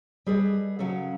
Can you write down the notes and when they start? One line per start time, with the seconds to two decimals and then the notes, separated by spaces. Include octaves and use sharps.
0.26 G3 G#4 A4 B4 D#5
0.79 C#3 F#3 C#4 A4